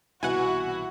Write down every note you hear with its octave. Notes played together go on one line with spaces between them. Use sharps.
C2 B2 E3 E4 F#4 F#5 G#5